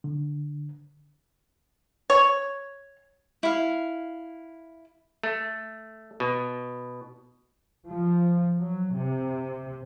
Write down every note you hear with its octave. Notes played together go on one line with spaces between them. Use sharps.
D3
C#5
E4 F5
A3
B2
F3
F#3
C3